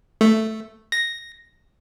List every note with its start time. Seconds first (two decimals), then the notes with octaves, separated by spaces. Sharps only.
0.21 A3
0.92 A#6